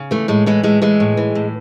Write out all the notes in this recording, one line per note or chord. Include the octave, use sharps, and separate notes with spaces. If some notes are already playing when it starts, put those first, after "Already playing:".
Already playing: C#3
E3 A3
A2 G#3
E3 G#3
A2 G#3
E3 G#3
A2
E3
A2